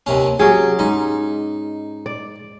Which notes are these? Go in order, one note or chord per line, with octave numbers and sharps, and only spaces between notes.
D#2 C3 C#4
F#3 C#4 G4 G#4
G#2 D#4
D5